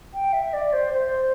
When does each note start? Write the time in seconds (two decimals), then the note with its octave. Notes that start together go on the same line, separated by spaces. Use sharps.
0.13 G5
0.32 E5
0.53 D5
0.72 C5
0.92 C5